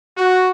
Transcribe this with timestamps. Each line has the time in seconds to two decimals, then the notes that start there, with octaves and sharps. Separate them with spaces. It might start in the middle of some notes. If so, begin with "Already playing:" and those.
0.17 F#4